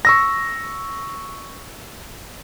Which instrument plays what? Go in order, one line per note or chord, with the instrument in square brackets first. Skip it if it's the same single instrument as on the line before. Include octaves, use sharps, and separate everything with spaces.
[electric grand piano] C#6 E6 A#6